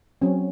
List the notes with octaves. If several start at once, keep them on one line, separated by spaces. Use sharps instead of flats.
F#3 C4 C#4